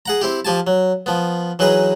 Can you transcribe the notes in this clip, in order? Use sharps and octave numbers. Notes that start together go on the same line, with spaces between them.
G#4 F#5 A#5
C4 E4 G4
F3 G4 G#5 A5
F#3
F3 B3
E3 F#3 D#4 G#4 B4 D#6